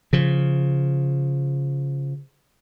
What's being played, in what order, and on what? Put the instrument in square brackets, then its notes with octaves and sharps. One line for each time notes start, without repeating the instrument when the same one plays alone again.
[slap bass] C#3 F3